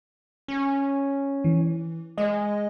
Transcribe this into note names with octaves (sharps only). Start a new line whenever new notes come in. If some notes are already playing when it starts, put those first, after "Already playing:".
C#4
E3
G#3 D#5